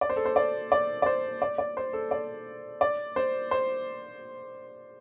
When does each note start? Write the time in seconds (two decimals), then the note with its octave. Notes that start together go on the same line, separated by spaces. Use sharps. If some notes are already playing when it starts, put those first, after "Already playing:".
0.01 D5
0.10 C5
0.16 A4
0.25 C5
0.36 D5
0.72 D5
1.02 D5
1.06 C5
1.42 D5
1.58 D5
1.77 C5
1.93 A4
2.11 D5
2.81 D5
3.16 C5
3.51 C5